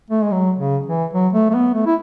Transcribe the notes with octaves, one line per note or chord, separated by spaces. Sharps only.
A3
G#3
F#3
C#3
E3
F#3
A3
A3
B3
A3
E4